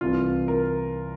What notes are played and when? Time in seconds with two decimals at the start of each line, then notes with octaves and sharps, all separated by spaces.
0.01 C2 C3 E3 F4
0.48 A#4